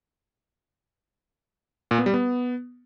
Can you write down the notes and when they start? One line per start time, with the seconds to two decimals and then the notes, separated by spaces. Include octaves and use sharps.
1.91 A#2
1.99 B3
2.06 G3
2.14 B3